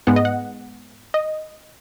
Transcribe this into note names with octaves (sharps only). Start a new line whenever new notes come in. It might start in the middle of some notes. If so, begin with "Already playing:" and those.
G#2 G#3 B3 F#5
D#5
F#5
D#5